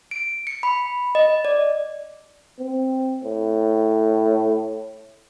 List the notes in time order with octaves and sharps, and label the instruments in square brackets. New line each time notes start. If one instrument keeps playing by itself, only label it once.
[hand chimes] D7
C#7
B5
D#5
D5
[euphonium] C4
A2